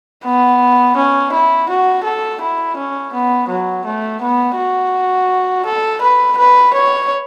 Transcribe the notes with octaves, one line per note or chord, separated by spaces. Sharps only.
B3
C#4
E4
F#4
A4
E4
C#4
B3
F#3
A3
B3
F#4
A4
B4
B4
C#5